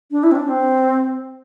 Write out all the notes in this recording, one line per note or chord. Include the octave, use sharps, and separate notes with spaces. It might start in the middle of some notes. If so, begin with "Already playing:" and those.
D4
E4
C4
D4
C4